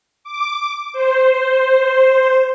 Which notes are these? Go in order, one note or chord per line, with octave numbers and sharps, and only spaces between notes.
D6
C5